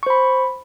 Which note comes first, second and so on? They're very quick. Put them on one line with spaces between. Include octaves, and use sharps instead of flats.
C#6 C5 B5